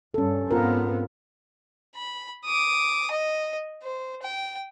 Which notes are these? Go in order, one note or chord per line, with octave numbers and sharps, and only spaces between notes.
G2 C#4 A4
G#2 B3 C4 F4 A#4
B5
D6 D#6
D#5
C5
G5